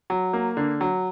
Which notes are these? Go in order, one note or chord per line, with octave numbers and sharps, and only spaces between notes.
F#3
A#3
D3
F#3